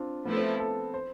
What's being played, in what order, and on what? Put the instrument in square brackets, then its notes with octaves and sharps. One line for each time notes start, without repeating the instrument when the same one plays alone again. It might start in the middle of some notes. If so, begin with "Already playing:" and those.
Already playing: [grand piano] C4 D4 F4
[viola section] F3 A3 E4 A4 [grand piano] B3
[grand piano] C4
A4
C5